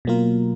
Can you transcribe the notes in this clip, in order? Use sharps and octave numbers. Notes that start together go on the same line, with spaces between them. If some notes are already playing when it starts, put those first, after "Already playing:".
B2 F#3 A#3 F4 A#4